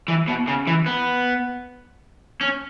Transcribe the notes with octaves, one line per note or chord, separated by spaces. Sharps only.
E3
B2
C#3
E3
B3
C#4